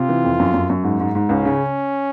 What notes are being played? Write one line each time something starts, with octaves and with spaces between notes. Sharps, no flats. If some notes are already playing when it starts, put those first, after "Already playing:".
Already playing: C3 F4
E3
F2
F#2
F#2
F#2
G#2
G#2
G#2
C#2 C#4
C#3